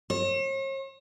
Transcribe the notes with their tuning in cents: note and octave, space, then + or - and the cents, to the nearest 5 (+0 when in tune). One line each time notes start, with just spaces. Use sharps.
C#5 -45